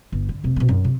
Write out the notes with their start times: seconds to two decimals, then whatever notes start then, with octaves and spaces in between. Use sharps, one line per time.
0.12 G1
0.29 D3
0.44 F1 C3
0.56 B2 C4
0.68 F#2
0.84 C3